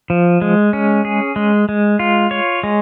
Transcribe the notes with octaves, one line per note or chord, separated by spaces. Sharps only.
F3
G#3
C#4
G#4
G#3
G#3
F4
C#5
G#3